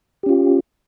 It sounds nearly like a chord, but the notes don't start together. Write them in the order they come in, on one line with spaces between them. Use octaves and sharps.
G4 C#4 F4